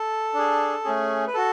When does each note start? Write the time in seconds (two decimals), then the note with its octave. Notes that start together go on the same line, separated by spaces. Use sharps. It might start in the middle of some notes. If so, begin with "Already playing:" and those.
Already playing: A4
0.34 D4 G#4
0.85 A3 C#4 G#4
1.27 B4
1.34 F#4 A4